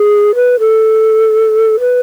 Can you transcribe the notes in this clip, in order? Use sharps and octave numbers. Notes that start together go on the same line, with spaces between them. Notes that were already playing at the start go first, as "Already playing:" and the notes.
Already playing: G#4
B4
A4
B4